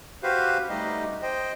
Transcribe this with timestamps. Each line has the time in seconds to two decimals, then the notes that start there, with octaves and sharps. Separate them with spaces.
0.23 F#4 G4 B4 C5 F5
0.69 G3 A3 D#4 G4 D#5
1.22 C5 D#5 G5